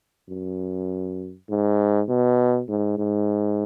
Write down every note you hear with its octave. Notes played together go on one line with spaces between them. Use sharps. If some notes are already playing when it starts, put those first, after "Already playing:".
F#2
G#2
B2
G#2
G#2